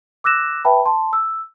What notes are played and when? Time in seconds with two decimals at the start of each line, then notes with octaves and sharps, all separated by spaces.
0.24 D6 E6 F#6 A#6 E7
0.65 B4 E5 G5 A5 B5
0.86 A5 C6
1.13 E6